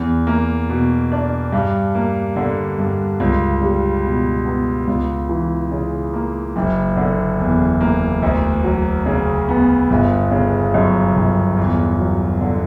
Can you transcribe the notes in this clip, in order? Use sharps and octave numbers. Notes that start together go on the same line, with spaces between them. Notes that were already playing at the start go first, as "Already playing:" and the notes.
Already playing: E2
A#3
B2
D4
G2
A#3
D3
G2
C#2
G3
B2
B3
C#2
E3
C#3
A#3
F#1
D3
E2
A#3
D2
F#3
C#3
B3
G1
C#3
F#2
G1
E2
F#3
D3